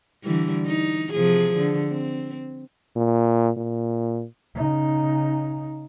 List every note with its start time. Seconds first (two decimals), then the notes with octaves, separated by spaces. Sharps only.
0.23 D3 E3 G3
0.66 D#4
1.13 C3 F3 G#4
1.57 D3
1.88 C4
2.96 A#2
3.57 A#2
4.55 C#3 D#4